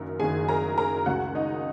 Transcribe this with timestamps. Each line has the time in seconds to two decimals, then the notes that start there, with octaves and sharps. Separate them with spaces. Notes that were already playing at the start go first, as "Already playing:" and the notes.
Already playing: F#1 F#2 D#3 A#4
0.20 F#1 F#2 D#3 G#4 G#5
0.48 A#4 A#5
0.78 A#4 A#5
1.06 C#2 C#3 F#4 F#5
1.35 D#4 D#5